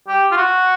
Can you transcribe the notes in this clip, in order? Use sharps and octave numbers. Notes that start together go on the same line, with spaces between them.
G4
F4
F#4